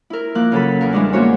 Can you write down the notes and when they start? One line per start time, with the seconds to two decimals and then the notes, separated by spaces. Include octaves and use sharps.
0.10 E4 A#4
0.35 F3 A#3 F#6
0.52 C#3 F#3 A4 B5
0.81 E2 A#4
0.93 E3 G3 G#3 C#4 D4
1.13 A#3 B3 F#4 C5 C#5